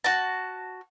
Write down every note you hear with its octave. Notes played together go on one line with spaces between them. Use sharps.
F#4 A5